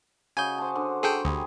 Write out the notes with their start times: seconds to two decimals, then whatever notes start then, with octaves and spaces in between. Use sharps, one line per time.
0.37 C#3 F#4 D#5 G#5 G6
0.58 C5 A5
0.76 D3
1.03 G#4 A4 G5 A#5 C#6
1.25 D2 G3 G#4